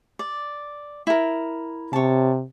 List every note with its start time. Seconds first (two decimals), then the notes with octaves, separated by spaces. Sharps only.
0.19 D5
1.07 E4 A#4
1.93 C3 C#5 A5